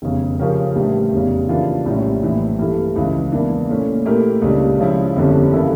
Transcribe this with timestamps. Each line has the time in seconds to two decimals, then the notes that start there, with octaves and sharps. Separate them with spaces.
0.02 F1 E2 C#3
0.39 C#3 F3 C#4 G4 A#4
0.75 A1 A2 G3 D4
1.12 F1 E2 C#3 G3
1.49 C#3 E3 A#3 D4 F4
1.85 A#1 A2 G3 C#4
2.23 A#1 A2 E3
2.59 G2 E3 A3
2.96 C#2 C#3 E3
3.32 E2 E3 A#3 D4
3.69 A#2 A3 C#4
4.05 A#2 A3 E4 G4 A#4
4.42 C#2 C#3 G3 D4
4.79 C#3 F3 C#4 E4
5.16 G1 F2 D3 G3 C#4
5.52 C#3 E3 A#3 E4 A4